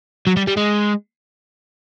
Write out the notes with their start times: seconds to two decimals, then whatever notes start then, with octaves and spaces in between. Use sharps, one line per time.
0.27 F#3
0.37 G3
0.47 G3
0.57 G#3